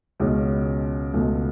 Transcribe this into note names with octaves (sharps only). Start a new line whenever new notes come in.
C#2 B2 G#3 C#4 G#4
C#2 B2 A3